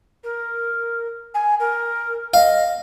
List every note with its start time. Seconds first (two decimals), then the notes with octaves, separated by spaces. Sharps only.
0.23 A#4
1.34 G#5
1.59 A#4
2.34 D#5 F5